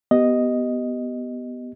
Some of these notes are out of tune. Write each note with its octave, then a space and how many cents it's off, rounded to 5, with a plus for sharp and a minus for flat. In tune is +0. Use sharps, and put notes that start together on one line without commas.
B3 +0 G4 -10 D#5 +0